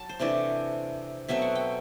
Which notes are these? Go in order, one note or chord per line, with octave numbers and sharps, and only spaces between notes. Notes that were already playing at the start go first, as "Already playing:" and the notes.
Already playing: F#3 A5
C5
C3 E3 A3 D4 D5
B2 F#3 A3 C4 E5
F#5
G5